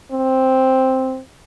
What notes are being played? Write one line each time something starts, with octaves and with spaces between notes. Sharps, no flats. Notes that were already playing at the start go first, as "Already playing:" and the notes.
C4